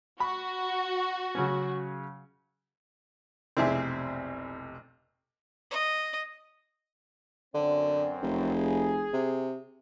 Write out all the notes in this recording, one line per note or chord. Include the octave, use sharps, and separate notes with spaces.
F#4 B5
C#3 F#3 C#4
F1 B1 C3 C4 E4 G#4
D#5
F#2 D3 C4
F1
G#4
C3